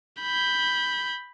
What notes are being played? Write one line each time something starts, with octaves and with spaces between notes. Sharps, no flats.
B5 G6